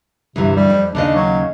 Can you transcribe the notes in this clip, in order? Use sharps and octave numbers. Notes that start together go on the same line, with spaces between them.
D2 G2 C3 E3
G3
F2
D#2 C#3 D4 D#5
F#3